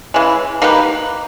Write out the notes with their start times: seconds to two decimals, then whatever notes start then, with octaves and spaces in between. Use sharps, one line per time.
0.14 C#3 E3 G#3
0.62 A#3 D#4 G4 B4